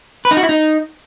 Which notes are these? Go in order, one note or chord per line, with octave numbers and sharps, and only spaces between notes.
B4
D#4
F#4
E4
D#4